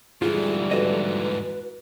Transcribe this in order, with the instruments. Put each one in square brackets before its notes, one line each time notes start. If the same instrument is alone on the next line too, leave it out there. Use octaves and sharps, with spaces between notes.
[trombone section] F2 D3 G3 [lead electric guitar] G#2 E3 [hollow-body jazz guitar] F4 [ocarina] G#4
[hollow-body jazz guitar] F#4 A4 D#5 [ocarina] B4